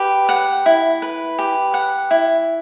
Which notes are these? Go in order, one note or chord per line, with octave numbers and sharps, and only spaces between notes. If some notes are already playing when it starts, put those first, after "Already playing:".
Already playing: G4 B4
F#5
E4
B4
G4
F#5
E4